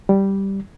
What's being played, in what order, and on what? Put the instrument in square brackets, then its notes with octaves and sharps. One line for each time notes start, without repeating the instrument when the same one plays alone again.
[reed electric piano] G3